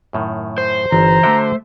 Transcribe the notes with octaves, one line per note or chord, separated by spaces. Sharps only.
F#2 A2 D#3
C5
G1 E3 A#5
D3 A3 F#4 E5 G5